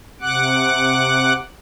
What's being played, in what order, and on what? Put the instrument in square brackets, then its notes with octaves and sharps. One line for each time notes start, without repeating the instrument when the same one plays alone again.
[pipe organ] C3 F#5 D6 F#6